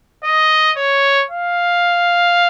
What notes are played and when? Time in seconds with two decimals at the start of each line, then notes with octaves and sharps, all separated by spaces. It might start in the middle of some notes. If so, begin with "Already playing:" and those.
0.24 D#5
0.77 C#5
1.30 F5